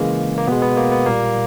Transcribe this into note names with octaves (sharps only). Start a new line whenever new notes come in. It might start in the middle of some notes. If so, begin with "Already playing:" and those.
Already playing: C#3 E3 G#3 A#3
A#3
B2 G#3 B3
B3
A#3
B3
A#2 G3 A#3